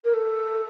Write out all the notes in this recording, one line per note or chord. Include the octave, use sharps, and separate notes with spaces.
A#4
A4